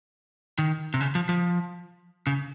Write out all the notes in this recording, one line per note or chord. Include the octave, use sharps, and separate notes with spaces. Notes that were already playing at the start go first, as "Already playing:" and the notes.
D#3
C3
C#3
F3
F3
C#3